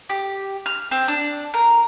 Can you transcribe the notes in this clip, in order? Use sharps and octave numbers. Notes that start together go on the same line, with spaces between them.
G4
F6
C4
D4
A#4